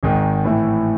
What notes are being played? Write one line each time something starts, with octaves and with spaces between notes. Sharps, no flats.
G#1 G#2 D#3
A2 E3 A3 E4